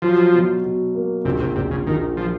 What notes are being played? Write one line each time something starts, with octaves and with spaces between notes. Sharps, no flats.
F3 F#3
B2
B2
A#3
A#1 C3
C3
A#1 C3
C#3
A#1 D#3
F3